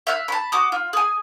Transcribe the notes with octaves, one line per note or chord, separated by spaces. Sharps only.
E5 F5 F#6
A5 B5
F#4 D6 D#6
F4
G#4 G#5